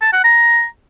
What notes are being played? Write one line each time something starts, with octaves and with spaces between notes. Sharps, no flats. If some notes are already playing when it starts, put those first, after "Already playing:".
A5
F#5
A#5